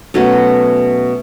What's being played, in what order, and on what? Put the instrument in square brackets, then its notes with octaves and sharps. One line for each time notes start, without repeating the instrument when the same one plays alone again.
[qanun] B2 F#3 A3 C#4